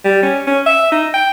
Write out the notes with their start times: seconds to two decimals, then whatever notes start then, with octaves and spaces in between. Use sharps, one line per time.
0.05 G3
0.23 C#4
0.47 C#4
0.66 E5
0.92 D#4
1.14 G5